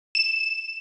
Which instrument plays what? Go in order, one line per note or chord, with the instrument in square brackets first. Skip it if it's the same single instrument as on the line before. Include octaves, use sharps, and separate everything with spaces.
[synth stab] E7